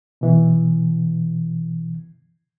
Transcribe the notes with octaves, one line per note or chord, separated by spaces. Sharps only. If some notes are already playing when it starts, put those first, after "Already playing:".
B2 E3